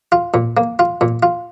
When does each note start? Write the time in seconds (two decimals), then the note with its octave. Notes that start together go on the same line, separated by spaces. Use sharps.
0.12 F4
0.34 A#2
0.57 A#3
0.79 F4
1.01 A#2
1.23 F4